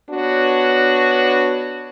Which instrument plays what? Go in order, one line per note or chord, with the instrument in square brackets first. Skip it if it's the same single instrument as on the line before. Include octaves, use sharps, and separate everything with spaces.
[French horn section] B3 D4 F#4 B4 C#5